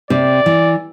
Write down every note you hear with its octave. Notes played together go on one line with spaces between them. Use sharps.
C3 D5
E3